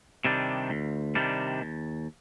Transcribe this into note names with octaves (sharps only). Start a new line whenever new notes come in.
C3 D#3 G3 D4
D2
C3 D#3 G3 D4
D#2